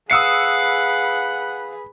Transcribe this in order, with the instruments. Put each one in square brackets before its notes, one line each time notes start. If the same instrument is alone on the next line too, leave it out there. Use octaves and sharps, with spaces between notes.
[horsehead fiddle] G#4 B4 [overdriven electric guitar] F5 [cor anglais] F#5 [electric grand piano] D#6 E6 C#7